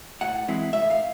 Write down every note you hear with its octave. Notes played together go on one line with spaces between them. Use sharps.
A2 F#5
E3 G#3 C4 E4
A2 E5
F5